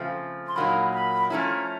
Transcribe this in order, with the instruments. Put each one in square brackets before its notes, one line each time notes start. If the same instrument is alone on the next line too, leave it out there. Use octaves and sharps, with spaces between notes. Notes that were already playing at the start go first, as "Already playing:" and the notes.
Already playing: [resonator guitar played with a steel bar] C#3 F3 A3 C4
[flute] C6
[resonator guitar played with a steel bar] A#2 F#3 A#3 D#4 [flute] B5
[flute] B5
[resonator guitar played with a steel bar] F3 A3 C#4 E4 [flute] A#5